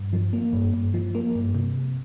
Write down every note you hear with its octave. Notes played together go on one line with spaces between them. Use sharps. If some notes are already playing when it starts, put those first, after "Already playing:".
Already playing: G2
F3
A#3
G2
G2
F3
A#3
G2
C3